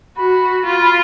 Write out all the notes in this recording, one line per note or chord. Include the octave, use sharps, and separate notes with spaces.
F#4 B5
F4